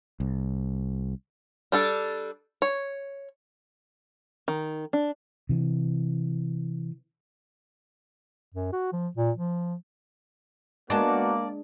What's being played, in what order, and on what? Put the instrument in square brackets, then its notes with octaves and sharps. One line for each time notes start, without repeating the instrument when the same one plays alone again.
[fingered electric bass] C2
[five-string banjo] G3 D4 A4
C#5
D#3
D4
[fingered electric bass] C3 E3
[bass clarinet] F#2
F#4
F3
A#2
F3
[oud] G#3 D4 [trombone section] A#3 [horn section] B3 F#4 [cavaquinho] D5 A5